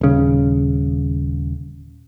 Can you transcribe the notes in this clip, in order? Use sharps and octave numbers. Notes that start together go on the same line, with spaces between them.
D#1 C#3